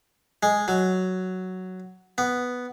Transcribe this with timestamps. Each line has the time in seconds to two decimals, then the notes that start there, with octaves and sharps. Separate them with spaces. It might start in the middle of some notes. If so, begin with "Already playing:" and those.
0.43 G#3
0.68 F#3
2.18 B3